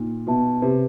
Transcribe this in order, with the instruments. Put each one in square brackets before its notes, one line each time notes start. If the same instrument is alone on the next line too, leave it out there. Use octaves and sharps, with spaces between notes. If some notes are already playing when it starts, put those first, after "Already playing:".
Already playing: [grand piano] A#2 [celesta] D#4
[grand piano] B2 [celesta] F#4 B4 E5 A5
[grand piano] C3 [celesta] B4